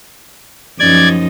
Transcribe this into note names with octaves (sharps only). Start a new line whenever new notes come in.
F#2 F3 D#4 D5 G#6